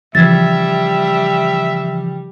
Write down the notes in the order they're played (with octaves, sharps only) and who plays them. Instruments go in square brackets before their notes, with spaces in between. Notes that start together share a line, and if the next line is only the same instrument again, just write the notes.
[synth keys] C#3 E3 F3 [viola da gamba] G3 [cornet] E5 [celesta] G#6 A6